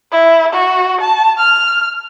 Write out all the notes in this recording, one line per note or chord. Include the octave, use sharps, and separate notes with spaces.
E4
F#4
A5
F6